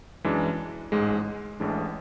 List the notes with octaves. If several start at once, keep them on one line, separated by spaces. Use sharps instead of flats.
F#2 E3 G#3 D4
A1 G#2 G#3
A1 A2 E3 G#3 D4